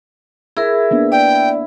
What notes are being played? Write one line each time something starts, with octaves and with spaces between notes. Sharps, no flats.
E4 G#4 A#4
A#3 B3 D4
D5 G5